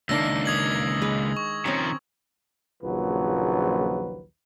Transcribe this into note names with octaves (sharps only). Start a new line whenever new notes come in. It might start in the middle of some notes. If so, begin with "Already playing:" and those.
C#2 D#3 A#3 D4 E5 E6 A#6
D#6 G#6 F#7
G#3 B4
C#6
D#3 F3 C4 C#4 A#4
A#1 D#2 C#3 F3 F#3 B4